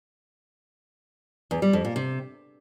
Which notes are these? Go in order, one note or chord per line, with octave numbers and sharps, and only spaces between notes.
E2
G3
F2
A#2
C3